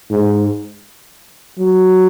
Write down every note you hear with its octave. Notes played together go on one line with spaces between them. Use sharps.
G#2
F#3